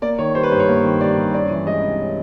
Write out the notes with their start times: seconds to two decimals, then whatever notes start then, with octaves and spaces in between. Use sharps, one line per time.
0.02 A#3 D5
0.18 D#3 C#5
0.35 G3 C5
0.43 B4
0.52 G2 C5
0.59 C#5
0.68 A#3
0.84 D#3
1.01 G3 D5
1.17 G2
1.34 C#4 D5
1.51 E3
1.67 G#3 D#5
1.83 C3
2.00 C#4